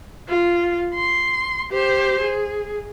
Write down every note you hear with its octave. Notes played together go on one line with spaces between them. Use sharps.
F4
C6
G4 C5
G#4